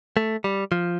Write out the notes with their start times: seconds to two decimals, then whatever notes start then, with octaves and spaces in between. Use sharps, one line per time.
0.17 A3
0.44 G3
0.72 F3